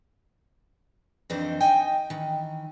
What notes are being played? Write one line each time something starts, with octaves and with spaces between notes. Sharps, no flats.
F2 D#3 E3 C4 D4 D#4
D#4 D#5 G5 G#5
D#3 E3